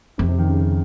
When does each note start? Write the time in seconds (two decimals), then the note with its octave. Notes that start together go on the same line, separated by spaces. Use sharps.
0.18 F2 C3
0.29 C3
0.38 D#3
0.48 C#3
0.58 C3